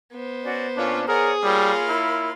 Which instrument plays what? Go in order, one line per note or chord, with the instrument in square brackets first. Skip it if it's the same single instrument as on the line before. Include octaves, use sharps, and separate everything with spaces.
[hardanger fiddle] B3 C5
[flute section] C#4 F#4 D5
[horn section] A#2 C#4 [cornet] D4 [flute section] F4
[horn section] G#4 [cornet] A#4 [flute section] C#5 D5 F#5
[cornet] G3 [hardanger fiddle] A#3 F4 [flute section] A#4 C#5 B5
[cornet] E4